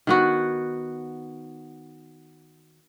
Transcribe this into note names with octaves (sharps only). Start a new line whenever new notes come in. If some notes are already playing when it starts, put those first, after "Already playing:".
D#3 B3 F#4